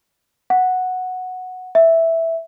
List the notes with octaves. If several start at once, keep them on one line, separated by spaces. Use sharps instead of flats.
F#5
E5